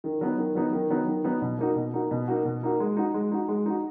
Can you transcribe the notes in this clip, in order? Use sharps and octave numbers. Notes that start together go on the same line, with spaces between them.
D#3
F#3 B3 D#4
D#3
F#3 B3 D#4
D#3
F#3 B3 D#4
D#3
F#3 B3 D#4
B2
A#3 D#4 F#4
B2
A#3 D#4 F#4
B2
A#3 D#4 F#4
B2
A#3 D#4 F#4
G#3
D#4 F#4
G#3
D#4 F#4
G#3
D#4 F#4